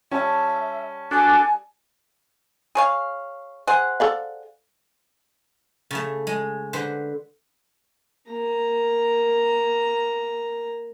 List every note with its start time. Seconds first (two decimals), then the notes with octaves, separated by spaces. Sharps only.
0.11 G3 C#4 E5 A5
1.11 D4 F#4 A4 G#5
2.75 G#4 C#5 F5
3.67 G#4 C5 F#5
4.00 A4 D5 F5
5.91 C#3 A3
6.27 G#3
6.73 D3 B4 C5
8.30 A#3 A#5